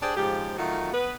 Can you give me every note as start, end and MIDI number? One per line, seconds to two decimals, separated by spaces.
0.02 0.17 62
0.02 0.17 67
0.02 0.17 68
0.02 0.17 72
0.02 0.17 74
0.17 0.55 44
0.17 0.55 49
0.17 0.55 53
0.17 0.55 67
0.58 0.93 51
0.58 0.93 54
0.58 0.93 57
0.58 0.93 63
0.58 0.93 65
0.58 0.93 66
0.93 1.16 59
0.93 1.16 71